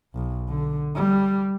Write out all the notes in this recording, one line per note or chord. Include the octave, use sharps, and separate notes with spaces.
B1
D3
G3